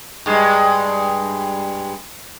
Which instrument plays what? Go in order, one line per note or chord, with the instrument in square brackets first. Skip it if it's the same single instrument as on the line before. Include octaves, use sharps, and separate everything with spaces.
[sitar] G2 G#3